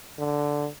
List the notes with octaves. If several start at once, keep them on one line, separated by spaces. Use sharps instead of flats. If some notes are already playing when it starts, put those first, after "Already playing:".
D3